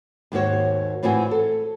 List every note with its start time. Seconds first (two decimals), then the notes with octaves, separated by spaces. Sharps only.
0.32 D#2 G#2 A#3 F#4 C#5
1.03 A2 E3 C4 F4 F#4 G#5
1.31 A4